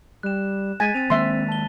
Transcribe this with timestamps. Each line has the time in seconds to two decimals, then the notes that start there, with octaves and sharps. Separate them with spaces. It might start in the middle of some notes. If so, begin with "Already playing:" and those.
0.23 G3 F#6 E7
0.80 G#3 G#5 A6 B6
0.94 C4 A6 D#7 F7
1.10 D#3 G#3 A#3 E5 C6
1.48 A5 G7